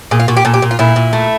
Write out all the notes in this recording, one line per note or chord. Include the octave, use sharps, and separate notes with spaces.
A#2 G#4
F4
A#2 F#4
G4
A#2 A4
G4
A#2
F4
A#2 E4
A#2
A3